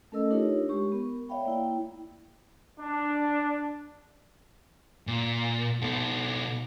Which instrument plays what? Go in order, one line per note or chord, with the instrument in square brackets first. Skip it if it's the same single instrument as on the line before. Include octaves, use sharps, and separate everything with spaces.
[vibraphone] A3 C#4 A4 A#4 D#5 E6
D4 D#4 F4 G4 A#4 C#5
G#3 G4 C#6
B3 A#4
C#5 D5 E5 F5 G5 B5
A#3 E4 G5
[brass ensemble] D4
[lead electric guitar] A#2
B2 A4